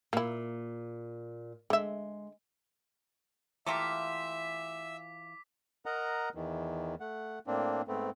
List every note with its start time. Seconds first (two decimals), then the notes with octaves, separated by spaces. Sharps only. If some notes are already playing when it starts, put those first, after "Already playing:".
0.13 A#2 A#3 E4
1.70 D3 G#3 E5
3.66 E3 A3 A#3 F4 G4 E5 D6 B6
5.86 A#4 D#5 F#5 A#5
6.35 E2 D#3 E3
7.00 A3 F#5
7.47 A2 A#3 C4 D4
7.88 G#2 A3 B3 C4